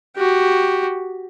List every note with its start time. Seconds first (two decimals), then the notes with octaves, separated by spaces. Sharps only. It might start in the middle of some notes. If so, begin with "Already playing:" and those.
0.16 F#4 G4